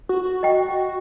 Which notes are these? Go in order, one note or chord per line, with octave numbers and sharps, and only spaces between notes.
F#4
D#5 G5